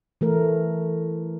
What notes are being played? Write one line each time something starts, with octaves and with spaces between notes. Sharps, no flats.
E3 A3 A#4